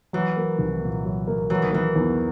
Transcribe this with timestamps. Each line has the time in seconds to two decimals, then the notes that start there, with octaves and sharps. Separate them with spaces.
0.13 E3 F#3
0.37 A#3
0.59 C2
0.82 A#2
1.05 F#3
1.27 A#3
1.50 E3 F#3
1.62 D#3
1.73 E3 A#3
1.96 E2